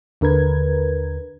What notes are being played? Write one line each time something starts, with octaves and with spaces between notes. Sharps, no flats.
D#2 D3 A#4 B4 G#6